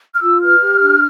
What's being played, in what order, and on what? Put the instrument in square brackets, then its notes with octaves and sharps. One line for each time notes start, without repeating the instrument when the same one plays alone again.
[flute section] F6
F4 E6
B4 F6
G4
D4